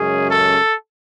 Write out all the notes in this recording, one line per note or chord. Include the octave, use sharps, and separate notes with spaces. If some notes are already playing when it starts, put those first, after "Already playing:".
Already playing: F#2 C#3 G#3 C#4 G#4
A4